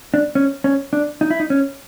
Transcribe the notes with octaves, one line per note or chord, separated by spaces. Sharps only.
D4
C#4
C#4
D4
D#4
E4
D#4
C#4